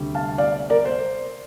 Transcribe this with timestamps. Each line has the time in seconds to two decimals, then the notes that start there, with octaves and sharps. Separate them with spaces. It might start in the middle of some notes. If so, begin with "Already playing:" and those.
Already playing: D2 C3 G3
0.15 F5 A5
0.38 D5 F5
0.70 A#4 D5
0.85 C5